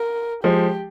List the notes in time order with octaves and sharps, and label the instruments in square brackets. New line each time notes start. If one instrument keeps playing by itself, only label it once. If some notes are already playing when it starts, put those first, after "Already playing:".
Already playing: [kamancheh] A#4
[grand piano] F3 G#3 [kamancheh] G4